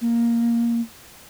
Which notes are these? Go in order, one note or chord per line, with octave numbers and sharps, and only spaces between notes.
A#3